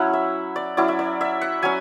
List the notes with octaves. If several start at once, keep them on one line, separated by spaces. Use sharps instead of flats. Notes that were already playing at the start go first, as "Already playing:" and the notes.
Already playing: F#3 C#4 E4 F#5
E5
D5
F#3 C#4 E4 D5
E5
D5
E5
F#5
F#3 C#4 G#5